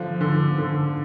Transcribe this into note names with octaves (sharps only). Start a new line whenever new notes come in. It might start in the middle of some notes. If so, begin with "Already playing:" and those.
Already playing: D3 F3
D3
D3